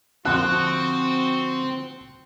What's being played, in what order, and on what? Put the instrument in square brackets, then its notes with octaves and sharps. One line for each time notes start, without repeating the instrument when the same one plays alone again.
[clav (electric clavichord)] D3 F3 [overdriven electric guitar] C4 [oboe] F#4 [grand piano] F#6